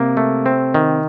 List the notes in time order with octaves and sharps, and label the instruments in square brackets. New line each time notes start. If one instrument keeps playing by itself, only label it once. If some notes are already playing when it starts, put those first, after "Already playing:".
Already playing: [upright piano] C3 [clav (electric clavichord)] A#3
[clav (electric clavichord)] A3
C4
D#3